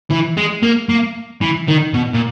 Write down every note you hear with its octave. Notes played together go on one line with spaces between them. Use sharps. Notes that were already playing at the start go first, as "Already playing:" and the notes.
E3
G#3
A#3
A#3
E3
D#3
B2
A#2